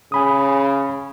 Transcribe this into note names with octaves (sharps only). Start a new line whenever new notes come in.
C#3 G#5 B5 D#6